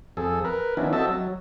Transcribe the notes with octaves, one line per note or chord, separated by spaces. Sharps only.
F2 G#4 A4
A#4 B4
D#3 F3 B3 C#4 D4 E4
C4 F#4 A4 D#5 E5 A5
F#3